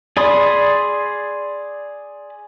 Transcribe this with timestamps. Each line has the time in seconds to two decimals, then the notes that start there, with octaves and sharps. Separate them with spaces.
0.17 G#4 D5 B5 C6 D#6